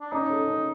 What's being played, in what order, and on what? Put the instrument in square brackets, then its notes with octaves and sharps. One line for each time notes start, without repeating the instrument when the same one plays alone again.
[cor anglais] D4
[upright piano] C#4 [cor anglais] D#4
[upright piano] A4
C#4